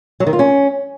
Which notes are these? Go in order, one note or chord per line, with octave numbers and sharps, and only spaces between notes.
F#3
D#3
F4
C#4